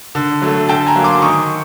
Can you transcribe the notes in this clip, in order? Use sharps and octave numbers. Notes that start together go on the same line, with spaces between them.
D3
F#3 A3
D3 G5 A5
G#5 A#5
F#3 A#3
C6 D6
D#3 C#6 D#6